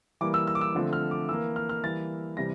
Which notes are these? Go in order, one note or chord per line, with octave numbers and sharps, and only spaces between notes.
E3 G3 A#3 D6
E6
E6
D6
E6
D3 F3 A3 C4
F6
D6
E3 A#3 E6
F6
F6
E3 G3 A#3 A6
C3 E3 G3 A#6